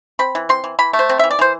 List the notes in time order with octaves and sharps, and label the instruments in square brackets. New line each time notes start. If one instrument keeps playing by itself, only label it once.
[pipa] C4 B5
E3
C4 C6
E3
E3 B5
A3
C5
C4
E3 E5
D5
E3 C5